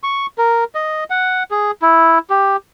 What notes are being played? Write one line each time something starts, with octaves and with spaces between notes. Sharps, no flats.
C#6
A#4
D#5
F#5
G#4
E4
G4